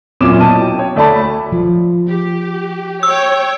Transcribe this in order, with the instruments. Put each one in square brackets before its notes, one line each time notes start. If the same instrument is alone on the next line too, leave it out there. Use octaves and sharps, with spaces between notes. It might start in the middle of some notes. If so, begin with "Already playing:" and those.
[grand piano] F#2 A#2 C#5 D6 E7
B2 E4 A5 D#7
G5
C#5
D2 A3 D5 A5 B5
[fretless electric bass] F3
[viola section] G4
[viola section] C#5 G5 [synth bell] E6